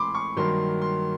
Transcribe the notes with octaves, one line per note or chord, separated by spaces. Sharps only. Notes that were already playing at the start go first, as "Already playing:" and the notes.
Already playing: A2 E3 G#3 C4 B5 C6 D6
C#6
G2 D#3 F#3 A#3 C6
C6